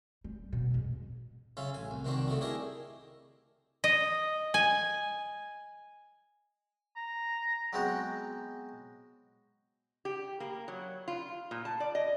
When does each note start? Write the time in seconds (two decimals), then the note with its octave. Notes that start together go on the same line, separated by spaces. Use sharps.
0.24 G3
0.53 B2
0.70 F2 G#2
1.57 C#3 C#4 F4 E5
1.74 A1 G#5
1.91 C2
2.05 C3 D#3 C4 D4 F#4
2.28 C#3 A3 D#4 F#4
2.41 D4 E4 G4 G#4 A#4 D#5
3.84 D#5
4.54 G#5
6.96 A#5
7.73 F#3 G#3 B3 C4 F#4
10.05 G4
10.40 A#3
10.68 F#3
11.08 F4
11.51 A#2
11.65 A5
11.80 D5
11.95 D#5